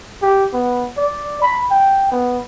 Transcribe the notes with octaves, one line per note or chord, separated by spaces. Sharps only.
G4
B3
D5
B5
G5
B3